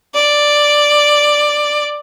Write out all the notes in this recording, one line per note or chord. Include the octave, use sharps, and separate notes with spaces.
D5